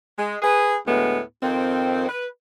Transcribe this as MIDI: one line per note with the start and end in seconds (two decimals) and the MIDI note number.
0.19 0.37 56
0.42 0.76 68
0.42 0.76 71
0.87 1.21 38
0.87 1.21 45
0.87 1.21 56
0.87 1.21 59
1.43 2.06 41
1.43 2.06 51
1.43 2.06 60
2.09 2.27 71